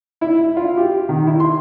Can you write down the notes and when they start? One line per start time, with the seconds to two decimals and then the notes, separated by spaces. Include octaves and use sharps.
0.21 E4
0.57 F4
0.77 G4
1.09 D#3
1.27 E4
1.40 C6